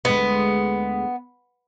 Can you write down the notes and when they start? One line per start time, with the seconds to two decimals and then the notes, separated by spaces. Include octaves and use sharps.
0.05 D2 G#3 B3